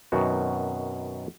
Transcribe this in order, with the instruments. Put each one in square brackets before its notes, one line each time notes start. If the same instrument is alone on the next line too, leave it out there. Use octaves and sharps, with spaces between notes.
[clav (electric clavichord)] F#2 B2 D#3 C4 F#4